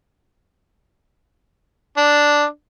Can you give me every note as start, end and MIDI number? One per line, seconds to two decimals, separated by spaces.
1.97 2.44 62